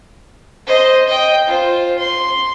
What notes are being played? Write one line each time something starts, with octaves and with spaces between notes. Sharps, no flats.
C5 D#5
D#5 G5
F4 C5
C6